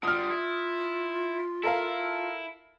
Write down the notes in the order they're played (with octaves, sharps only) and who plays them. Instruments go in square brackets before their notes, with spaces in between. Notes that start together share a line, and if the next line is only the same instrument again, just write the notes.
[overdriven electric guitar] D3 G3 [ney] F4 [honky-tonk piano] D#6 F6
[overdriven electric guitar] E4
[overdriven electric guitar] E4 [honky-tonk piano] A4 A#4 F5